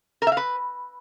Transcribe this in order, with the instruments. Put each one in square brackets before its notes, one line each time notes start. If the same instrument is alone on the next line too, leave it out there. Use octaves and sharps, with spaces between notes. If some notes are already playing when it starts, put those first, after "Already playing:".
[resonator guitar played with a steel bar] A#4
E5
F5
B4